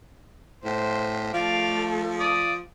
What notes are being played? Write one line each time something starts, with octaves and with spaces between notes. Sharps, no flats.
A2 C5
F3 A3 A4 D5 F5
D5 D#6